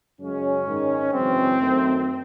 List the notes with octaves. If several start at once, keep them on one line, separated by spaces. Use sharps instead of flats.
F#2 C#3 G#3 C#4
G#2 D#3 G#3
F#2 C#3 E3 G#3 C4
F#2 D#3 A3